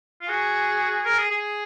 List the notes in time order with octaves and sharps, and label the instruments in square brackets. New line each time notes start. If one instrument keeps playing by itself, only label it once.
[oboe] F4
[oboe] F#4 [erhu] G#4
[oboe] A#4
G#4
G#4